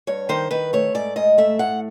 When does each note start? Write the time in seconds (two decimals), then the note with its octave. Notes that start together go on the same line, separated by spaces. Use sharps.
0.07 G2 C#5
0.29 D#3 C5
0.51 D#3 B4
0.73 A3 C#5
0.94 G#2 D5
1.16 G#2 D#5
1.38 A3 E5
1.59 A2 F#5